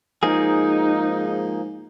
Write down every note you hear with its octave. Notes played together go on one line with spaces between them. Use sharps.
G#2 F3 A#3 D#4 G#4